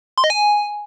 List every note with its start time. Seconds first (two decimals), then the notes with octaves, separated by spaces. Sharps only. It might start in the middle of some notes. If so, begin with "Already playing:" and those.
0.18 C6
0.24 D#5
0.30 G#5